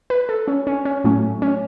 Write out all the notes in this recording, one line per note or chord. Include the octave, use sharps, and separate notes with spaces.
B4
A4
C#4
C#4
C#4
A2 F#3 A3 C#4
C#4